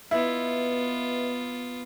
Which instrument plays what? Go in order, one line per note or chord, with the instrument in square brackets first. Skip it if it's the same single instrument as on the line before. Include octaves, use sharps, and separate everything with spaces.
[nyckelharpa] B3 F4 [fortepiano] E4 [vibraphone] B4 D#5 E5